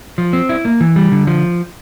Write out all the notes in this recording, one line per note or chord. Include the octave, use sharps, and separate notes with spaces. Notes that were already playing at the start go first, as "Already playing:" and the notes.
F3
C4
E4
A#3
E3
G3
D3
F3